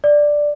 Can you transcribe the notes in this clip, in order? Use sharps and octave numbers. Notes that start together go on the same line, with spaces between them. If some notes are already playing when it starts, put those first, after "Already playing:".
D5